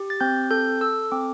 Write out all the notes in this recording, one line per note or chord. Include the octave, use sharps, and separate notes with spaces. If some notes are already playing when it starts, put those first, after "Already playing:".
Already playing: G4
A6
C4 G6
A4 G6
A4 E6
C4 D6